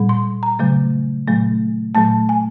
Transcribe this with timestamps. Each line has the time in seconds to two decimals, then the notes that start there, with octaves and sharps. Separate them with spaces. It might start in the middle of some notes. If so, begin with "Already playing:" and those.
Already playing: A#2 G3
0.09 C6
0.43 A#5
0.59 C#3 F#3 A3
1.27 A#2 F#3 A3
1.95 A#2 F#3 A3 A5
2.29 G#5